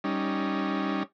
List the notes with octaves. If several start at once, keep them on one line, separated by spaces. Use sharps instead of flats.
G3 C#4 D#4